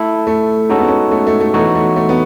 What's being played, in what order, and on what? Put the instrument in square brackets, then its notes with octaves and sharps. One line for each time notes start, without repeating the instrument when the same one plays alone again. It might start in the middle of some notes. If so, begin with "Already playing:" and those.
Already playing: [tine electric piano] A3 E4 A4
[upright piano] A3
[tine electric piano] G#3 D#4 F#4 A4 [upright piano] C#4
[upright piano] B3
C#4
A3
A3
A3
[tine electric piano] E3 B3 D#4 F#4 C#5 [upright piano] A3
[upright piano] A3
A3
B3